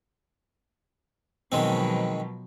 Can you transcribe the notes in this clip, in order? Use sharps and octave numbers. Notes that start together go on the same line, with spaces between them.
B2 D#3 F3 F#3 G#3 C4